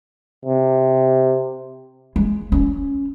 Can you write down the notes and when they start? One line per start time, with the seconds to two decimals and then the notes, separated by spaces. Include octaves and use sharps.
0.45 C3
2.16 G#3
2.52 C#4